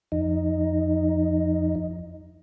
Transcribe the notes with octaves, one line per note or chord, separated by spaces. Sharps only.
F2 D#4